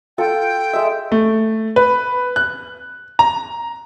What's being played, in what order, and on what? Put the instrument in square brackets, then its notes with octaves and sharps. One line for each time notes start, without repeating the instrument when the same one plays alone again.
[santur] F4 A4 F#5 [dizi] G5
[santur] G#3 E5
[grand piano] A3
B4
F#6
A#5